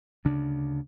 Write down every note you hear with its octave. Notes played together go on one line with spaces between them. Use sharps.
D2 C#3 D4